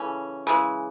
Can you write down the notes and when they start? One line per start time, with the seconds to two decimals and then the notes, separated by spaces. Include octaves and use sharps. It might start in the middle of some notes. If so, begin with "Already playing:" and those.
Already playing: C#3 E3 A3 C#4
0.47 C#3 E3 G#3